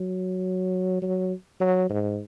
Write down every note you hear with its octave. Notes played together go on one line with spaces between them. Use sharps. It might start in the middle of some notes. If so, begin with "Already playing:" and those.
Already playing: F#3
F#3
F#3
G#2